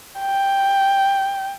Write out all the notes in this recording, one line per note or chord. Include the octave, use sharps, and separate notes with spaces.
G5